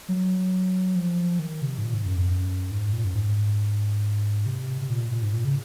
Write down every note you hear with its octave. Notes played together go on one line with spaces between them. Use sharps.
F#3
F3
D#3
C3
G#2
A#2
G#2
F#2
F2
F#2
G#2
A#2
F#2
G#2
C3
C3
A#2
A#2
G#2
A#2
C#3